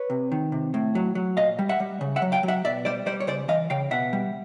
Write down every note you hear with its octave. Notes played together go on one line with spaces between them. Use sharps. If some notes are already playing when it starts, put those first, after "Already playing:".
Already playing: B4 C#5
C3
D#3
C3
A2
F#3
F#3
A#2 D#5 F5
G3
E5 F#5
G3
C#3
E5 F#5
F#3
F5 G5
F#3
E5 F#5
B2 D5 E5
G3 C5 D5
G3 C5 D5
C#5
C#3 C5 D5
E3 D#5 F5
C#3 F5 G5
B2 E5 F#5
G3